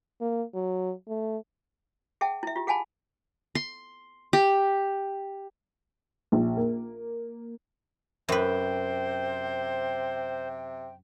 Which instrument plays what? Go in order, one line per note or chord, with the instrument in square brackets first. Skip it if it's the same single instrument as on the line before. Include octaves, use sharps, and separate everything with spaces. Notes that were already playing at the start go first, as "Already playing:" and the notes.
[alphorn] A#3
F#3
A3
[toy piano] G#4 E5 F#5 G5 A5
E4 E5
F4 G4
G#4 F5 F#5 G#5 A5 B5
[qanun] C6
G4
[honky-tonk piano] A#1
A#3
[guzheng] F#2 B4 [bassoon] C3 [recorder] C5 [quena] G5